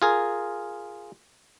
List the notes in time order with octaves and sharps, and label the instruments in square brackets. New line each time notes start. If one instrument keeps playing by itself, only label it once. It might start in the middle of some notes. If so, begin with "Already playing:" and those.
[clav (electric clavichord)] F4 G#4 A#4